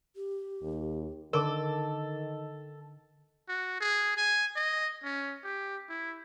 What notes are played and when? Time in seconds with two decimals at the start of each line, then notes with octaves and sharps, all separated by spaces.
0.16 G4
0.62 D#2
1.33 D3 D#3 A4 A#4 D6 D7
3.49 F#4
3.80 G#4
4.17 G#5
4.56 D#5
5.04 C#4
5.44 G4
5.89 E4